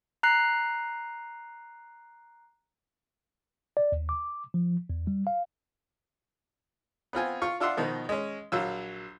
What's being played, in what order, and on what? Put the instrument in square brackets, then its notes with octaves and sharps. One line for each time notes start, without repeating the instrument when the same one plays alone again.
[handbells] A#5 F#6 C7
[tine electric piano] D5
D#2
D6
F3
E2
G3
F5
[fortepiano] B3 C4 F4 G#5
F4 C#6
D4 F4 E5 F#5 C6
B2 D#3 F3
G#3 C#4
A#1 F#3 F4 E6